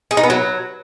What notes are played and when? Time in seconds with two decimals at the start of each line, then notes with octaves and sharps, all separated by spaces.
0.11 G#4
0.17 D#4
0.23 B3
0.30 F#3